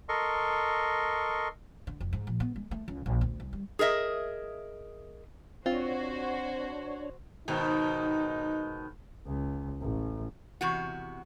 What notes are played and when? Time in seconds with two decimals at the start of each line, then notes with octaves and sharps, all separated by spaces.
0.09 A4 A#4 D#5 C6 C#6
1.87 D3
2.00 F1
2.13 G#2
2.27 A#1
2.40 B3
2.56 G#3
2.71 A3
2.88 C#2
3.06 A#1
3.21 D2
3.40 C2
3.53 G3
3.79 G#4 A#4 D#5 E5
5.66 C4 D4 F4 F#4 C5 C#5
7.48 G#2 B2 D#3 D#4
9.26 C#2
9.81 A1
10.61 E2 C3 F#4